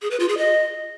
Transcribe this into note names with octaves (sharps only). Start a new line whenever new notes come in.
G#4
B4
F4
G#4
D#5